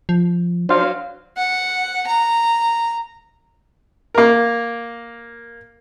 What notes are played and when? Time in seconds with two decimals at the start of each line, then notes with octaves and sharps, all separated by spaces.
0.09 F3
0.69 F#3 D4 C5 F5
1.37 F#5
2.07 A#5
4.14 A#3 A#4